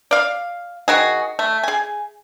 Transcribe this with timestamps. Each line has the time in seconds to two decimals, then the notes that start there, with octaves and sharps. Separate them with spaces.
0.11 D5 F5
0.88 D#3 F#4 G#4
1.39 A3
1.63 G#4 G#5